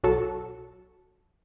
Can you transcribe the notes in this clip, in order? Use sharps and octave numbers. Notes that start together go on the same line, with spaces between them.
B1 F#3 F#4 A4 C#7